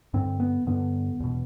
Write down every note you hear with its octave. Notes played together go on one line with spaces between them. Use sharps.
G2 D3 C4
B3
G2 D3 B3
E2 B2